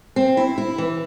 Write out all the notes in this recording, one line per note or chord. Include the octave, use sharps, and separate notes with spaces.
C4
E4
E4
E3